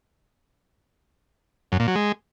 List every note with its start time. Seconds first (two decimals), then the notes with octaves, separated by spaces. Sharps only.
1.72 F#2
1.80 A#2
1.88 F#3
1.96 G#3